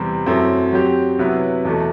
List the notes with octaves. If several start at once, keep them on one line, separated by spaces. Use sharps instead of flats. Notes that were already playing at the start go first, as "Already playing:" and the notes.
Already playing: E2 C3 G3 C4
F#2 F#3 A3 C4 E4
F#3 C4 G4
C3 F#3 B3 E4 B4
E2 B2 A3